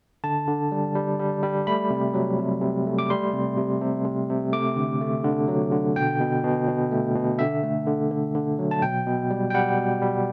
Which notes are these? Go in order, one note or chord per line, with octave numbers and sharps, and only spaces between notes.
D3 A5
D3
G3
G3
G3
G3
A3 B5
C3
F#3
C3
C3
A3
D6
G3 C6
C3
C3
C3
C3
C3
A3 D6
D3
A3
D3
F#3
D3
B2 G5
B2
B2
B2
A3
B2
D3 E5
A3
D3
D3
D3
F#3
A5
B2 G5
B2
G3
G5
G3 F#5
B2
G3